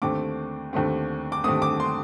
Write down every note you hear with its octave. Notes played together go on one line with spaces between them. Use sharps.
D#2 D3 A3 C4 D6
D#2 D3 A3 C4
D6
D#2 D3 A3 C4 D#6
D6
C6